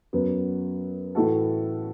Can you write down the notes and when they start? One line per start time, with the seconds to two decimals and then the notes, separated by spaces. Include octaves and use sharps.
0.13 F#2 F#3 B3
1.15 A2 E3 A3 F#4 A4